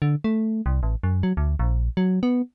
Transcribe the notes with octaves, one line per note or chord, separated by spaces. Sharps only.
D3
A3
C2
A1
F#2
F#3
D2
A#1
F#3
B3